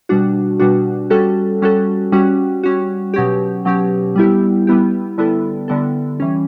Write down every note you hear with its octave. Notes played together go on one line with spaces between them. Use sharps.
B2 G3 D4 F#4
B2 G3 D4 F#4
G3 C#4 F#4 A4
G3 C#4 F#4 A4
G3 C#4 F#4
G3 C#4 F#4
B2 F#3 C#4 G4
B2 F#3 C#4 G4
G3 B3 E4 G4
G3 B3 E4 G4
D3 G3 B3 E4 A4
D3 G3 B3 E4 A4
E3 G3 C#4